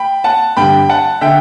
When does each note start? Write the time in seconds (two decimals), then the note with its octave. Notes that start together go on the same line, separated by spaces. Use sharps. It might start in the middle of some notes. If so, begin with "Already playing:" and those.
Already playing: G5 B5
0.24 F#5 A5
0.57 G2 D3 G5 B5
0.89 F#5 A5
1.21 D3 E5 G5